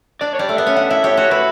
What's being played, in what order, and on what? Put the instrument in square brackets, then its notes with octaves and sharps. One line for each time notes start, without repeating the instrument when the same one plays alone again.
[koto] D4 [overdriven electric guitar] D5
[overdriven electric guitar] C#5
[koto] G3 [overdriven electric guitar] D5
[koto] A3
[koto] B3 [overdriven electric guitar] E5
[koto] C#4
[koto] D4 [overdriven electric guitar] F#5
[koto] E4 [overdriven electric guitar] E5
[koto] G4 [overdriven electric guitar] C#5
[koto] F#4 [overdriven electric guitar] C#5
[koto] E4 [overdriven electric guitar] B4